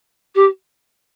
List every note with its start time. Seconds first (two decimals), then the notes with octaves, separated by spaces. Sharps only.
0.35 G4